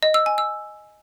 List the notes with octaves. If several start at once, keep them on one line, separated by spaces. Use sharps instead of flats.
D#5
E6
G#5
E6